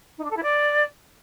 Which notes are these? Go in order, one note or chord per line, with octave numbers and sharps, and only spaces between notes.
D#4
D4
A4
E4
D5